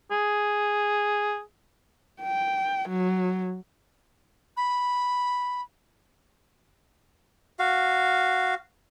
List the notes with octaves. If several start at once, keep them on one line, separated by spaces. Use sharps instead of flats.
G#4
G5
F#3
B5
F#4 F5